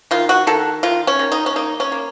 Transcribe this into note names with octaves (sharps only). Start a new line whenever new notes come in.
D#3 F4
F#4
D#3 A4
D#3 F4
C#4
D#3
D#4
C#4
A#3 D#4
C#4
A#3